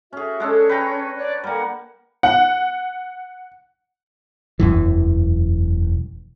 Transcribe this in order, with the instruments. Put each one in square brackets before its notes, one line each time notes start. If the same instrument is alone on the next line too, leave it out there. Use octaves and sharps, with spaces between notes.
[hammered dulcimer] C#4 G#4 [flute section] F#4 E5
[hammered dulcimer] G#3 D4 A4 [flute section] C#4
[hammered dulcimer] B4 G5 A#5
[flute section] C#5 D5 F#6
[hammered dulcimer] G3 A#3 [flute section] F#5
[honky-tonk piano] F#5
[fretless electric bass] E1 F#2 E3